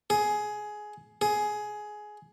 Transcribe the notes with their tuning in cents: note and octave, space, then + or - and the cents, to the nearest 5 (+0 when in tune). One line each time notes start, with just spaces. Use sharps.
G#4 +15
G#4 +15